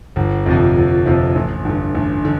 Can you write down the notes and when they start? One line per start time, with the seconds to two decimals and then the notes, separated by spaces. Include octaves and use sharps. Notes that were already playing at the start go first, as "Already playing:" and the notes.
0.16 G1
0.46 F2 C3 F3
0.76 G1
1.05 F2 C3 F3
1.35 A1
1.65 G2 D3
1.95 A1
2.25 D3